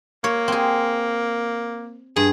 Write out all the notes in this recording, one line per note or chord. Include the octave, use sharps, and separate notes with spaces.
A#3 C#5
C4 G#4
G2 G#4